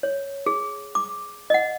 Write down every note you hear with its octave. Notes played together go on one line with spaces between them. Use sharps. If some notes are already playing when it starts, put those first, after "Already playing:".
C#5
G#4
D6
D#5 F#5